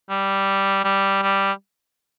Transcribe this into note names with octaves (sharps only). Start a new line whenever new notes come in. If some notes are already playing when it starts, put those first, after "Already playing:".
G3
G3
G3